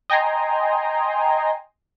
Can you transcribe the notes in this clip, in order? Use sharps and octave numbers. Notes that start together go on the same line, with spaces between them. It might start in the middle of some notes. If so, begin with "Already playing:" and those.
D#5 G5 G#5 A#5 C6